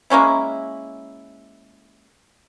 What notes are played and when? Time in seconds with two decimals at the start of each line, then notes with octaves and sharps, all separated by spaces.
0.10 G#3 A#3 C#4 E4